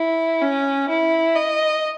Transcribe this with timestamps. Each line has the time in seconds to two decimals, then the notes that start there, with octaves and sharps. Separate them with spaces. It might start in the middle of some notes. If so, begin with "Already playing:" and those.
Already playing: E4
0.41 C#4
0.89 E4
1.36 D#5